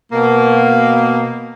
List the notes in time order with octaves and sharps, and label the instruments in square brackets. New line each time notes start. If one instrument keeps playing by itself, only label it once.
[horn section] B2 A#3